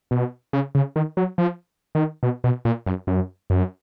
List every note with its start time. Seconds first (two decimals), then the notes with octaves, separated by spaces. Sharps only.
0.11 B2
0.53 C#3
0.75 C#3
0.96 D#3
1.17 F#3
1.38 F3
1.95 D#3
2.23 B2
2.44 B2
2.65 A#2
2.86 F#2
3.07 F#2
3.50 F#2